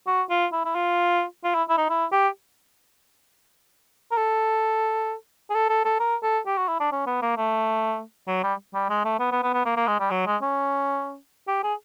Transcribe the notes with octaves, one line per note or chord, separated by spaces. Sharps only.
F#4
F4
E4
E4
F4
F4
E4
E4
D#4
E4
G4
A#4
A4
G#4
A4
A4
A4
A#4
A4
G4
F#4
E4
D4
C#4
B3
A#3
A3
F#3
G3
G3
G#3
A3
B3
B3
B3
B3
A#3
A#3
G#3
G3
F#3
G#3
C#4
G4
G#4